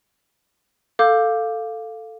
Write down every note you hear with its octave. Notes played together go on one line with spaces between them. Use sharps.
A4 F5 D6 G6